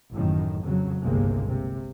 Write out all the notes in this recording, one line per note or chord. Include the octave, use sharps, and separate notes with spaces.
A1 F#2 A2 D#3
F2 C#3 F#3
G1 C2 C3 G#3 A#3
C3